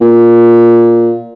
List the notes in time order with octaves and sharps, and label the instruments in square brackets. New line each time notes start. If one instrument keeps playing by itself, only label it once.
[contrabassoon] A#2